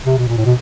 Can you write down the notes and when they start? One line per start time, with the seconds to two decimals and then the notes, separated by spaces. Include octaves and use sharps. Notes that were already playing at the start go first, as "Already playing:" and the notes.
0.06 C3
0.18 B2
0.28 A#2
0.38 A2
0.46 B2